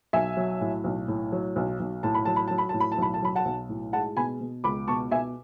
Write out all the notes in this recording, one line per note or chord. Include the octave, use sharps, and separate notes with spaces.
B1 E5 G#5
F#3
A2
B1
A2
F#3
B1
B1
A2 A5
B5
F#3 A5
B5
F#3 A5
B5
A2 A5
B5
A5
B1 B5
A5
F#3 B5
F#5 A5
B1
A2
G#3 F#5 A5
B2 G#5 B5
B2
C#2 B5 D6
B2 A5 C#6
B2 E5 G#5